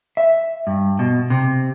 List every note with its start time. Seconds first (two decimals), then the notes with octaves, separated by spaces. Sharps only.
0.17 E5
0.67 G2
0.99 B2
1.30 C3